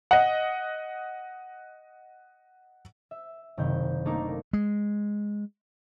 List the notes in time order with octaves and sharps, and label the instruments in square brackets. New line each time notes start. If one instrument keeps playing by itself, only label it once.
[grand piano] D#5 F#5
[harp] E5
F#1 C3 D#3 G6
A3 A#3 D4 D#4 A#4
[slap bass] G#3